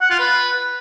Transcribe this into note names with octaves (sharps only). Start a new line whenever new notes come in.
F#5
F4
B4